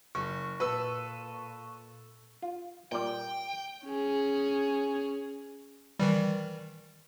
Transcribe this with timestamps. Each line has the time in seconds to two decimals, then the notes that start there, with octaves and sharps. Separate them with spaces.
0.15 F#1 C#6 F6
0.60 A#2 A4 B4 E6
2.42 F4
2.92 A#2 G3 D5 G5
3.85 C#4 G#4
5.99 D#3 E3 G3